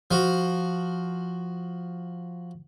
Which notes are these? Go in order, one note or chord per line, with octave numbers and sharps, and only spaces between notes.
F3 F#4